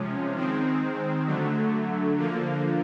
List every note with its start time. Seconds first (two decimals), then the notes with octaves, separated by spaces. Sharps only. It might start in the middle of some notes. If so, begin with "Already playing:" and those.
Already playing: C3 F3 G#3 C#4
0.35 D#3 G#3 C4
1.26 D3 F#3 A3
2.18 D3 F3 A#3